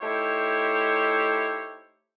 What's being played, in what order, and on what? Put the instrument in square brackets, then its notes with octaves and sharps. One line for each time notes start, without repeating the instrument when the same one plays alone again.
[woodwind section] A3 D#4 E4 G4 C5 C#5